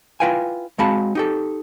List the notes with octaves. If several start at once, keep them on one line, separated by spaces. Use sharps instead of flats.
E4 F4 B4 F5 G5 G#5
G#3 C4 F#4 F5 A5 B5
D#4 G4 A4